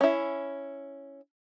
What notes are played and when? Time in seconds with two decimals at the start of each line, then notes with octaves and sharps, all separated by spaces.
0.01 C#4 E4